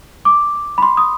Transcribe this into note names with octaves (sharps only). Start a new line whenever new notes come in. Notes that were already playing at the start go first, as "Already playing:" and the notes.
D6
B5
C6
D#6